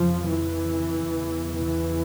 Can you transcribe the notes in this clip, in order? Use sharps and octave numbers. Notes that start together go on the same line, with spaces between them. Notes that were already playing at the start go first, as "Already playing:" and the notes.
Already playing: F2 C#3 F3
E3
E2 C#3
E3